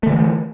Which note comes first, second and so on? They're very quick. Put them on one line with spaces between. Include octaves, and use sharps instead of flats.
A3 D3 E3